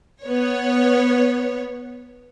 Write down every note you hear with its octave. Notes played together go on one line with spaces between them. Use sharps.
B3 C#5